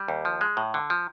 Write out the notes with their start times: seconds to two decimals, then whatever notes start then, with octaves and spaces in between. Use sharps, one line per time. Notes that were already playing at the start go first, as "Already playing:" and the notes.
Already playing: G3
0.08 D#2
0.25 F3
0.41 G#3
0.57 A2
0.74 D3
0.90 F3